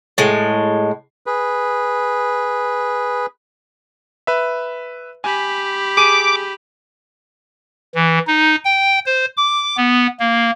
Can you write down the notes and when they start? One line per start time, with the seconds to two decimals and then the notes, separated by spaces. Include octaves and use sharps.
0.18 A2 G#3
1.26 G#4 B4
4.27 B4 E5
5.24 G4 G#5 B5
5.97 G#4 D6 D7 D#7
7.95 E3
8.27 D#4
8.64 G5
9.06 C5
9.37 D6
9.77 B3
10.20 A#3